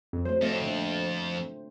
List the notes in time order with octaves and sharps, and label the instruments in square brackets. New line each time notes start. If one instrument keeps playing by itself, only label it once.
[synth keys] F2
[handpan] F#3 A3 [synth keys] C5
[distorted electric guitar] F2 [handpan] A3 C4
[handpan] A#2 D3